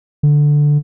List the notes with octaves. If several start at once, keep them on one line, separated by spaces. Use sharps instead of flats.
D3